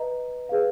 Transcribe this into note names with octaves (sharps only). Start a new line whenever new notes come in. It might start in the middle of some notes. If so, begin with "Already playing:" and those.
Already playing: B4 D#5 A#5
G#4 B4 F5